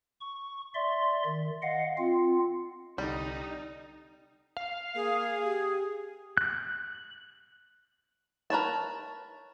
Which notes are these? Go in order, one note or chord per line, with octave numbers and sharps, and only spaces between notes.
C#6
D5 E5 C6
D#3
D#5 F5 F#5
C4 F4
C2 D3 G3 D#4
F5
A#3 G#4
G4
F#6
A#4 B4 C#5 A5